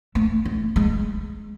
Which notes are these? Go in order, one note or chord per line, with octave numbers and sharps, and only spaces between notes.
A3
A3
G#3